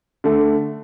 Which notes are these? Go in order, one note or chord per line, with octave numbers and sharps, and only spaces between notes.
D3 A3